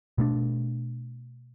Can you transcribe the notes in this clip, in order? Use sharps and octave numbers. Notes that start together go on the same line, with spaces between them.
B2 A3 D4